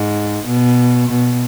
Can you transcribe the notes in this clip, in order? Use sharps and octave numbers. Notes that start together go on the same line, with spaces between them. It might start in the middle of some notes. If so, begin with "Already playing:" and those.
Already playing: G#2
B2
B2